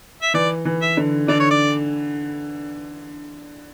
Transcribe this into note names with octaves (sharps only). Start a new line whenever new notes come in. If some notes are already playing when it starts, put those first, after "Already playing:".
E5
E3 D5
E3
E5
D3
D3 D5
C#5
D5